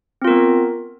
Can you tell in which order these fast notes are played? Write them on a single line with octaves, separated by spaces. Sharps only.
C4 F4 A#4 B3